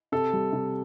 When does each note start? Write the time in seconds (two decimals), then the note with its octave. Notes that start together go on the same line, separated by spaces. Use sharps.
0.12 C3 A4
0.33 G3
0.53 C3